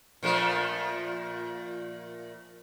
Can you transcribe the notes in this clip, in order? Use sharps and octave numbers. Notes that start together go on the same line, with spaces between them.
A#2 F3 A3